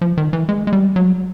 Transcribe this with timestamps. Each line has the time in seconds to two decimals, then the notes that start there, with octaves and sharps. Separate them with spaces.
0.01 F3
0.17 D#3
0.33 E3
0.49 G#3
0.67 G#3
0.73 G3
0.96 F#3